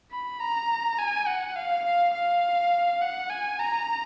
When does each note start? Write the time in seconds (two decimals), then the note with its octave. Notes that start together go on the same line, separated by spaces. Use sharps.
0.12 B5
0.40 A#5
0.98 G#5
1.27 F#5
1.56 F5
1.85 F5
2.14 F5
3.02 F#5
3.30 G#5
3.59 A#5